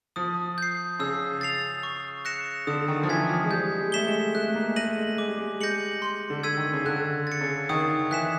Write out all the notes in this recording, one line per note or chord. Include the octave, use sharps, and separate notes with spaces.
F3 D#6
G6 C7
C#3 E6
A6 C7 F7
C#6
F#6 A#6 C#7 E7
D3 D#6
D#3
F3
E3 G#6 B6
F3
G#3
G3 G6
G#3
A3 B6 E7 G7
G#3
A3 F#6
A3
A#3
G#3
A3 A#6 D#7 F#7
G#3
G#3 D6
G3
G#3
G#3 G6 A#6 C#7 F#7
C6
D3
E6 G#6 B6 D#7
D#3
C#3
D3 F#6
A6 C#7
C#3
D#3 D#6
E3 F#6 B6 E7